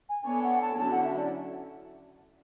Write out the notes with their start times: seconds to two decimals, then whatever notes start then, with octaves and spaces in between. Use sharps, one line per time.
0.09 G#5
0.26 B3 D4 A4 C#5 G#5
0.43 F#5
0.61 A5
0.78 D3 F#3 C#4 E4 A5
0.91 F#5
1.04 E5
1.17 D5